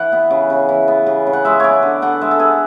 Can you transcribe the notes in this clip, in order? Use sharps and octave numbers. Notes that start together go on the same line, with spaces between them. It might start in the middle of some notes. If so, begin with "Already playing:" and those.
Already playing: E3 F#5
B3
C#3
C#3
E3
B3
C#3
C#3
F#5
G#3 E5
B3 C#5 D5
D3
D3 F#5
G#3 E5
A4
B3 G#4